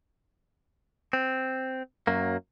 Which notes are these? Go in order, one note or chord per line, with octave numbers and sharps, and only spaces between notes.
C4
F#2 F#3 A#3